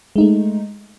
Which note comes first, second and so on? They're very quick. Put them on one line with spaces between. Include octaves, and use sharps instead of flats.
G#3 D#4 A3